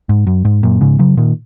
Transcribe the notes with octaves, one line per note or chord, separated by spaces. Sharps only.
G#2
F#2
G#2
F#2 A#2
G#2 C#3
C#3 F#3
A#2 D#3